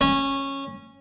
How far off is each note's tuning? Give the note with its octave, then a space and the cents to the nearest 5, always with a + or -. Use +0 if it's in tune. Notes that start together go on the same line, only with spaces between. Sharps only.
C#4 -15